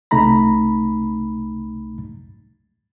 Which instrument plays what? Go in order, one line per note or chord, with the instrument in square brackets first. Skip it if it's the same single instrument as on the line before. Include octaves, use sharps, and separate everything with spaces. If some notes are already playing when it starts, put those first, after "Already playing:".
[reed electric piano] C2 C3 A3 D#4 A#5 B5